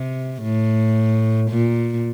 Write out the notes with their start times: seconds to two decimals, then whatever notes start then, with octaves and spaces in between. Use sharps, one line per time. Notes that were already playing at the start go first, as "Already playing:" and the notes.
Already playing: C3
0.43 A2
1.50 A#2